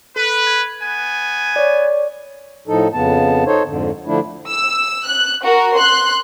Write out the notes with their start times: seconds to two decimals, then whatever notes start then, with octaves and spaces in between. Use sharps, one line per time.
0.16 A4 B4
0.47 G#6
0.82 B3 G#5
1.56 C#5 D5
2.68 A2 F3 D#4 A4
2.93 F2 C#3 B3 A5
3.46 D#4 A4 C5 C#5
3.65 F2 G#2 D3
4.06 D3 F3 A3 D4 E4
4.51 E6
5.07 F#6
5.45 F#4 A#4
5.79 C6 F#6